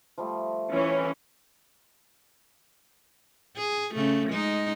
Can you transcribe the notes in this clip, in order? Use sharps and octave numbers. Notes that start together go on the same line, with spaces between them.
F3 G3 A3
E3 C#4 C#5
G#4
C#3 A3
G#3 D#4